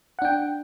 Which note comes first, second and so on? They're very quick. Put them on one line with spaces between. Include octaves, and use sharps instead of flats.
F#5 D4 G5